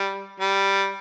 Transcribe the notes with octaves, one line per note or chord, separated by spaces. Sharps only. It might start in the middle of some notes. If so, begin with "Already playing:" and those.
Already playing: G3
G3